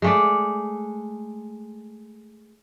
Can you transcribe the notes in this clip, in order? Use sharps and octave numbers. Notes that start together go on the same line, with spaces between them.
G#3 A3 D5